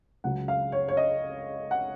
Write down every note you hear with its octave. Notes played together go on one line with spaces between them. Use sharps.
C#2 C#3 F#3 F#5
F5
C#5
C#5
D#5
F#5